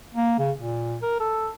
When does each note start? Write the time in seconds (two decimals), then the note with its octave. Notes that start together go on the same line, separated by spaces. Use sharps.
0.15 A#3
0.39 C#3
0.59 A#2
1.02 A#4
1.20 A4